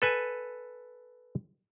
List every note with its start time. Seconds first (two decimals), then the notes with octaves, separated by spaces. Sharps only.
0.02 A4 B4 G#5